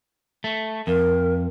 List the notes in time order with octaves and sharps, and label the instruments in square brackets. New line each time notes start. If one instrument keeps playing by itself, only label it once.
[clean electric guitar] A3
[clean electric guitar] F2 [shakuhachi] A#4